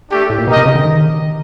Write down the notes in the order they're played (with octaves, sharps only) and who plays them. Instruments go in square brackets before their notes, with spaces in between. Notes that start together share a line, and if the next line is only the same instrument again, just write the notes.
[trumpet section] A3 D4 G4
[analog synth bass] A2
A#2
[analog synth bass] B2 [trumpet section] D#4 G4 A#4 D#5
[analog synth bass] C3
C#3
D3
D#3